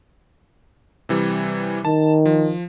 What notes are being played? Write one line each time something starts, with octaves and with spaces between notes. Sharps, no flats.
C3 E3 G3
D#3 A5
F3